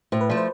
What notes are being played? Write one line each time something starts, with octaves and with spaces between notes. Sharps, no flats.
A2 C5
B4
F3 A3 D5
C5